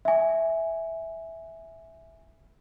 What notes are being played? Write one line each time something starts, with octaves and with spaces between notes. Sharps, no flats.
E5 G#5